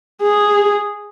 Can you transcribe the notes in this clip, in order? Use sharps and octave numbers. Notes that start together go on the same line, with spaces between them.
G#4